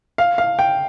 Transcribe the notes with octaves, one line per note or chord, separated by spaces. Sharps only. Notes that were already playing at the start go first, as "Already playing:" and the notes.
F5
F5
G5